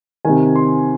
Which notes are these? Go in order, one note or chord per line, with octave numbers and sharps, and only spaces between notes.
C3 D#3 G#5
C6